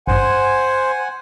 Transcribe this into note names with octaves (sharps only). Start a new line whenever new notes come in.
G#1 G2 C5 F#5 G#5